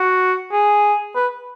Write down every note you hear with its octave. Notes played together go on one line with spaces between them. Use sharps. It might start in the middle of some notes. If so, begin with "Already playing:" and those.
Already playing: F#4
G#4
B4